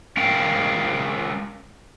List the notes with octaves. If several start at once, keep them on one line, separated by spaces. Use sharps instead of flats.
G#3 C#4 A#4 F5 G5